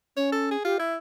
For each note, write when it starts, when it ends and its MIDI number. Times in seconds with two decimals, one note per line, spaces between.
0.17 0.56 61
0.17 0.29 73
0.32 0.51 69
0.51 0.63 68
0.64 0.78 65
0.64 0.77 67
0.79 0.96 64
0.79 0.93 76